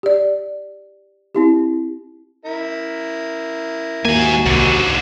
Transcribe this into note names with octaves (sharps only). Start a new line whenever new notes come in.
G4 D5
C4 E4 G4
E4 A#4
D#2 G#2 A#3 F#4 G#5
C2 G#2 D3